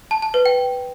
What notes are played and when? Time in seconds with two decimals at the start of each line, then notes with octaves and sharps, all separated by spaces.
0.11 A5
0.22 A5
0.34 B4
0.46 G5